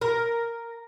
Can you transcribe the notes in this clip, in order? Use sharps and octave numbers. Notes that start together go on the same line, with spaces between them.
A#4